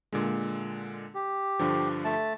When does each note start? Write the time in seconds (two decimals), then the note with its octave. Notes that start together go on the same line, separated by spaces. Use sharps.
0.12 A#2 D3 G#3
1.15 G4
1.59 G2 D3 F3
2.04 A3 A5